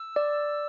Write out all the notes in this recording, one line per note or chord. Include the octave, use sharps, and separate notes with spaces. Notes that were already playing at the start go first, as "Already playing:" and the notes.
Already playing: E6
D5